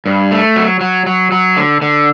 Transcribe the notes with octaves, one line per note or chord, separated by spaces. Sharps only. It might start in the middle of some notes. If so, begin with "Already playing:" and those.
G2
A3
F#3
F#3
F#3
F#3
D3
D3